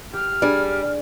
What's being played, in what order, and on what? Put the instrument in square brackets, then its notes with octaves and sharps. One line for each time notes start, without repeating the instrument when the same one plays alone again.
[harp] G4 [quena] F6
[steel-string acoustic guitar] G3 [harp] D4 G#4